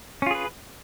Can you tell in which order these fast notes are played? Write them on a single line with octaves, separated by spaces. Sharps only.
C#4 F4 G#4 B4